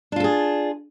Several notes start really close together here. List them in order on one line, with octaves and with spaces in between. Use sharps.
D4 F4 A4 G#4